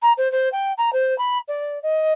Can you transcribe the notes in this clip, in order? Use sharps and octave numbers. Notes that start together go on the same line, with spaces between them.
A#5
C5
C5
G5
A#5
C5
B5
D5
D#5